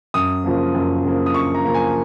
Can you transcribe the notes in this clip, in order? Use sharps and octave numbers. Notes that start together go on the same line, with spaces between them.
F#2 D#6
C#3 F3 A#3
F#2
C#3 F3 A#3
D#6
F#2 C#6
A#5
C#3 F3 A#3 A#5
G#5